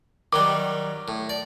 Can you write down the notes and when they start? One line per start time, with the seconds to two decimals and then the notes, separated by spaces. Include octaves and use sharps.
0.33 D#3 F#3 G3 D6
1.08 A2
1.29 D5